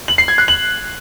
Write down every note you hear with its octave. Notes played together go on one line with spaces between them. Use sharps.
F#7
C7
G#6
F#6
F#7